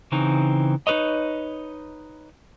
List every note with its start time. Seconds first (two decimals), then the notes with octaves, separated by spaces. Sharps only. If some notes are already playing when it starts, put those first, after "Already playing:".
0.12 C#3 E3 C4 D#4
0.87 D#4 F#4 B4 C#5 D#5